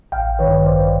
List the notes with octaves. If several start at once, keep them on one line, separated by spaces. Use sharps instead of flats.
A1 F5 G5
G2 D#3 B4 C#5
A1 C5 D5